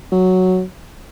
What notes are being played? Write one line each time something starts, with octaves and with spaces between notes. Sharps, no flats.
F#3